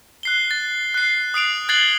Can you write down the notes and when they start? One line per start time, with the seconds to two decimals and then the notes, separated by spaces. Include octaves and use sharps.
0.23 F#6 C7 G7
0.51 A6
0.94 F#6 C7
1.34 D#6 C7 D7 F7
1.69 F#6 G#6 A6 C7 F#7 G7